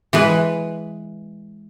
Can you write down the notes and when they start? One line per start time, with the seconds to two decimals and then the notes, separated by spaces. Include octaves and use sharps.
0.13 E3 G#3 B4